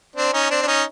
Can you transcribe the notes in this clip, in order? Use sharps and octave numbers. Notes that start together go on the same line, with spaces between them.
C4 D4
C#4 D#4
C4 D4
D4
C#4 D#4